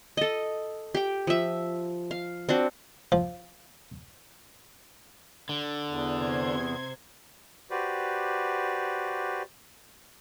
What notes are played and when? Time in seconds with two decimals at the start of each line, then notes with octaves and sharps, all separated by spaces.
0.17 A4 D#5
0.95 G4 G5
1.27 F3 E5
2.11 F5
2.49 C4 D4 F#4
3.12 F3
5.49 D3
5.89 E2
6.18 C3 C5 G#6
7.71 F#4 G4 B4 C5 D5